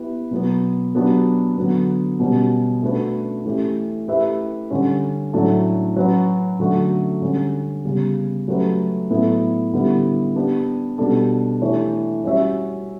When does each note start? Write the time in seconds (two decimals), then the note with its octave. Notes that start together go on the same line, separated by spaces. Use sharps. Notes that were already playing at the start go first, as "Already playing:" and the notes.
Already playing: B3 E4 G4 B4
0.31 B2 F#3 B3
0.95 F#3 B3 D4 G4
1.58 D3 F#3 B3
2.20 B2 G3 C#4
2.82 A3 D4 F#4 B4
3.45 E3 A3 C#4 G4
4.08 A3 E4 G4 B4 E5
4.70 D3 G3 C#4
5.33 A2 F#3 A3 D4 A4
5.96 F#3 C#4 F#4 B4
6.60 D3 F#3 A3 D4 F#4
7.22 D3 G3 C#4
7.85 C#3 G3 B3
8.48 F#3 A3 C#4 G4 B4
9.10 A2 F#3 B3 E4 A4
9.73 D3 G3 B3 E4
10.36 B3 D4 G4
10.98 B2 G3 D4 A4
11.62 E3 A3 D4 G4 C#5
12.24 G3 C#4 F#4 C#5 E5